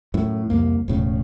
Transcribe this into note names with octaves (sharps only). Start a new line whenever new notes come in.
F#2 A2
C2 F2 A#3
E1 A2 C#3